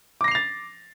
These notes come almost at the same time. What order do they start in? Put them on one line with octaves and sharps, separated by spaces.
D6 A#6 C7 F7 A6